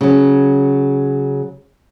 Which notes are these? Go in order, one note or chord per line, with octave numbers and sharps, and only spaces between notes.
C#3 F#3